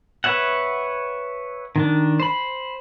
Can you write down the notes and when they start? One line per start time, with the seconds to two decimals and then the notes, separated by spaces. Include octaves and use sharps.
0.24 B4 C#5 E5 F#5
1.76 D#3 D4
2.20 C5 B5